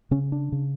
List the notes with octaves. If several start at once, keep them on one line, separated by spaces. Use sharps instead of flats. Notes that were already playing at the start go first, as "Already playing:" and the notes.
C#3 C#4
D4
C#3